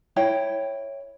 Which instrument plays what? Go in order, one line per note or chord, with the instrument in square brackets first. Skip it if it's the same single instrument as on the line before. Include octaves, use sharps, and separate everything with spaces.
[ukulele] E4 C#5 G5